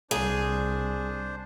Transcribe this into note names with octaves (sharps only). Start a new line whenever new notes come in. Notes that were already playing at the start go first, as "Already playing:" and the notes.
C2 D4 G#4 C5